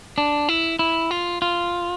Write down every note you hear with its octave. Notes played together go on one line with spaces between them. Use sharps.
D4
E4
E4
F4
F4